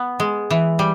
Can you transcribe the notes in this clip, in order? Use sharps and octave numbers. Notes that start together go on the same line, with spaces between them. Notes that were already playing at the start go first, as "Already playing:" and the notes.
Already playing: B3
G#3
E3
G3